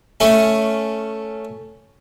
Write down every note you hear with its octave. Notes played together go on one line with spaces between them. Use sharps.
A3 C#4